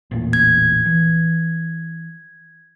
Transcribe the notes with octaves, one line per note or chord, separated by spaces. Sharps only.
A1 E2 A#2
G#6
E3